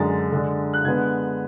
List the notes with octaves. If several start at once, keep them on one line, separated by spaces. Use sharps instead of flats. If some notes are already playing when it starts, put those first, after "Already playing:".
Already playing: F#2 D3 G#3 D4 A6
D3 G#3 D4
F#6
D3 G#3 B3 G#6